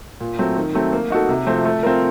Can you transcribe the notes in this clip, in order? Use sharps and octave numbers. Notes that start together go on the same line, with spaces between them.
A#2
F#3 A3 C4
D#3
F#3 A3 C4
A#3
D#4 F#4 A4
C3
F3 A3 C4
A3
C4 F4 A#4